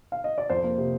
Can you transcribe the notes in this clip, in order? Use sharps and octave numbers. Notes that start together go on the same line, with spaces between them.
F5
D#5
D5
F2 C5
A#3
C3